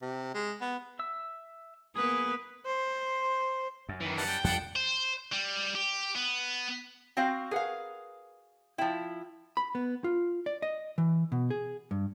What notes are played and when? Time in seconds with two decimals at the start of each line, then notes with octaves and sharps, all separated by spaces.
0.02 C3
0.35 G#3
0.61 B3
0.99 E5 E6
1.96 A#3 B3 G#4 B4 D#6
2.65 C5
3.89 F#2
4.01 D#3 E3
4.17 G3 F#5 A5
4.29 G5
4.44 F2 F3 G3 D4 F#5 A5
4.76 C5
5.32 G3
5.75 G4
6.16 B3
7.17 C4 F#4 F5 G5
7.51 G#4 A#4 B4 F5 F#5
8.78 F3 E4 G5
9.57 B5
9.75 B3
10.04 F4
10.46 D5
10.62 D#5
10.98 E3
11.32 B2
11.50 G#4
11.91 G2